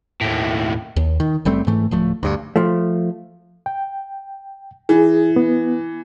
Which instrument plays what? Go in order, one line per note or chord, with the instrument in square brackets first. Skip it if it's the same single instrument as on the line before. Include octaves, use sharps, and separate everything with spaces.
[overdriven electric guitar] D#2 A2
[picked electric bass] D#2
D#3
F#1 G3 A3 C4
G#2 E3 A3
D1 F3 A3
D2 G2
[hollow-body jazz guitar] F3 A3
[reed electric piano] G5
[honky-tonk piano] E3 [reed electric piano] G#4
[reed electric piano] B3